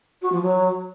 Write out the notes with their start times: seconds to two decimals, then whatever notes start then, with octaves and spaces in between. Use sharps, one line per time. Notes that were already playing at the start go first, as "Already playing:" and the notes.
0.22 F#4
0.32 F3
0.42 F#3